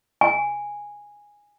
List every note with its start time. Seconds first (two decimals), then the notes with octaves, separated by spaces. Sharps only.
0.21 G#5